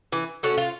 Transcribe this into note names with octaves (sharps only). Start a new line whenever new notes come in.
E3
A3 C#4 F#4
F4